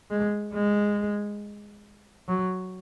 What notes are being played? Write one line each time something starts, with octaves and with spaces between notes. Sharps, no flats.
G#3
G#3
F#3